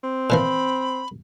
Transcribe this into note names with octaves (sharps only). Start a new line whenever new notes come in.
C4
A#2 E3 F3 B5